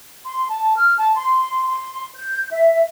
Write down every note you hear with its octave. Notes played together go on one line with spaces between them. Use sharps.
C6
A5
F6
A5
C6
C6
G6
E5